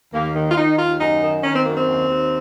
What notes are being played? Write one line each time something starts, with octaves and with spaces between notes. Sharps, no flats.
D#2 A#3
D#3
F4
D#3 D#4
D#2 F4
F#2 D#4
D#3
D#3 C#4
C4
F#2 A#3
C4
D#2
D#2